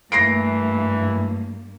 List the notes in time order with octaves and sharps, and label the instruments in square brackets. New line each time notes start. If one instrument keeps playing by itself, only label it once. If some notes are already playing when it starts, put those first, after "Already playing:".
[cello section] G2 G3 A#3 [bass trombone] E3 [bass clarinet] A3 [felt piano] A#6 C7 D7